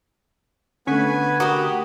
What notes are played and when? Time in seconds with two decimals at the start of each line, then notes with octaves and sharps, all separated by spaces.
0.87 D3 A3 B3 C#4 B4 G#5 C#6 B6
1.40 F#4 G4 A#4 B4 F#5 D#6